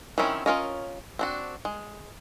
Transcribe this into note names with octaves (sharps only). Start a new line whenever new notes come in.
D#3 F#3 C4 C#4 E4
C#4 F4 A#4 C#5 D#5
C4 D4 F#4
G#3